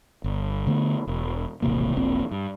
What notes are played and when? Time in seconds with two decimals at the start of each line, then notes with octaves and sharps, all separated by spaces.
0.24 G1
0.67 D3 A3 B3
1.07 E1
1.62 D#1 A1 C3 A#3
1.96 E1 A#1 A#2 C4
2.31 G2